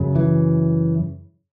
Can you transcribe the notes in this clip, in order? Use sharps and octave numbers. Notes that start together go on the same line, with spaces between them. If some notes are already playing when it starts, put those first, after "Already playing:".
Already playing: F#2 C#3
E3